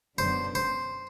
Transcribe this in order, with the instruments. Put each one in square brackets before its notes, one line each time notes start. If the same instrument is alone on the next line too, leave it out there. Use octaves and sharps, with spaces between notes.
[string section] F#2 D3 F#3 B3 D4 [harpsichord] C5
[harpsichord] C5